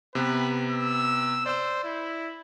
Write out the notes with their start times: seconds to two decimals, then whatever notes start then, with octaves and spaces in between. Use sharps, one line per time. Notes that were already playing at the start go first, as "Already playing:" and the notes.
0.15 C3 B3 B4
0.71 E6
1.46 C5 D5 E6
1.84 E4